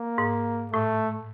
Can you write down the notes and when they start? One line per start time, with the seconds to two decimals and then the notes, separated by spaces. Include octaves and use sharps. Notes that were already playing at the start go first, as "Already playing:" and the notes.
Already playing: A#3
0.18 G#2
0.73 A2 A3